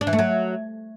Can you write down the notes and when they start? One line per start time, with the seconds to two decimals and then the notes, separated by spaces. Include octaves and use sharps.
0.01 D4
0.07 E3
0.13 A3
0.19 F#3